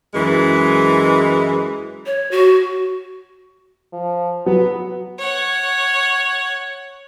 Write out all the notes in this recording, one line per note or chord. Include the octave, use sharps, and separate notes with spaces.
F#2 E3 G#3
C#5
F#4
F3
F#3 B3
C#5 F#5